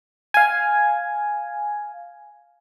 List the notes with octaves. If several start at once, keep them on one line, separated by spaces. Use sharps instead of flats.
F5 G#5